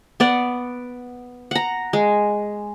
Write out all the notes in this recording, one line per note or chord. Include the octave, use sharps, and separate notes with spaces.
B3 D5 F#5
F#5 A#5
G#3